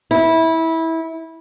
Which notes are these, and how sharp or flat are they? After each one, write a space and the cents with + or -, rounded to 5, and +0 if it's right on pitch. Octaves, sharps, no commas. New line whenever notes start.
E4 -20